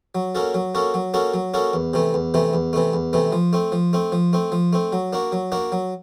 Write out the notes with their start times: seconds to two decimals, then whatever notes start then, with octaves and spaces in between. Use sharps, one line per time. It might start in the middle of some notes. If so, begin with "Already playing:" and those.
0.15 F#3
0.35 A#3 C#4 F#4 A4
0.54 F#3
0.75 A#3 C#4 F#4 A4
0.94 F#3
1.14 A#3 C#4 F#4 A4
1.34 F#3
1.54 A#3 C#4 F#4 A4
1.73 E2
1.94 C3 E3 A3
2.14 E2
2.34 C3 E3 A3
2.54 E2
2.73 C3 E3 A3
2.93 E2
3.13 C3 E3 A3
3.32 F3
3.53 A3 C4
3.72 F3
3.93 A3 C4
4.12 F3
4.33 A3 C4
4.52 F3
4.73 A3 C4
4.93 F#3
5.13 A#3 D4 F#4
5.32 F#3
5.52 A#3 D4 F#4
5.72 F#3